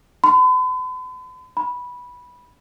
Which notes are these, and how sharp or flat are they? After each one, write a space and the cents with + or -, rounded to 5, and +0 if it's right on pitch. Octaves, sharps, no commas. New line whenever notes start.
B5 +45
B5 -10